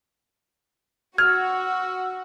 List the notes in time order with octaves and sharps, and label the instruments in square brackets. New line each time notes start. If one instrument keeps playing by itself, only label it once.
[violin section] F#4 [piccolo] E6 [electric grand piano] F6 [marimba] G#6